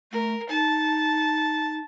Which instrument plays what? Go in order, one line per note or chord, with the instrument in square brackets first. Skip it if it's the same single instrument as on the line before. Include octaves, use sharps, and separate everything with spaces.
[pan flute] A3 [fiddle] A#4
[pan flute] D#4 [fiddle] A5